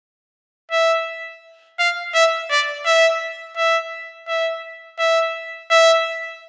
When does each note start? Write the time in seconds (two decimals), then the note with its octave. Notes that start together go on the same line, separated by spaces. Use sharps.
0.72 E5
1.79 F5
2.14 E5
2.50 D5
2.85 E5
3.57 E5
4.28 E5
4.99 E5
5.71 E5